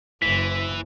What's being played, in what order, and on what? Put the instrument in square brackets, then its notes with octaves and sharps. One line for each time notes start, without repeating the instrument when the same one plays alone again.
[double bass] F#1 [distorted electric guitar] E3 [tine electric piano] B6